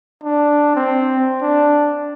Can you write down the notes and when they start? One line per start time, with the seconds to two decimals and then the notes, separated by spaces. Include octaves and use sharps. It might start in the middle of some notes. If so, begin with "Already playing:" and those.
0.23 D4
0.75 C4
1.42 D4